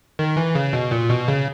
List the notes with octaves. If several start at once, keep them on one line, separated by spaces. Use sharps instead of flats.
D#3
E3
C#3
B2
A#2
B2
C#3